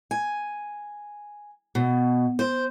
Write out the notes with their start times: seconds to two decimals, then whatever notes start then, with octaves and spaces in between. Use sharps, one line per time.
0.11 G#5
1.75 B2
2.39 C5